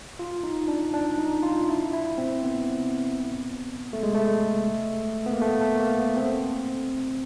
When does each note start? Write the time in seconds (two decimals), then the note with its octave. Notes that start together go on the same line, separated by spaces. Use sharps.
0.19 F4
0.43 D#4
0.68 D4
0.94 D4
1.18 D#4
1.43 F4
1.69 E4
1.93 E4
2.18 C4
2.43 B3
3.93 A3
4.03 G#3
4.15 A3
5.26 B3
5.33 A#3
5.41 A3
5.61 A3
5.80 A#3
5.99 B3
6.17 C4